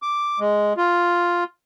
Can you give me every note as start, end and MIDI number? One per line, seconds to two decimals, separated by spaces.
0.02 0.39 86
0.40 0.73 56
0.77 1.44 65